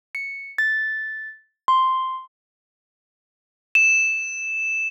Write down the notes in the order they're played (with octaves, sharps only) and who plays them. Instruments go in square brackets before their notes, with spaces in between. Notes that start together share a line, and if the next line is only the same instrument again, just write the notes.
[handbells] C#7
A6
C6
[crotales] E7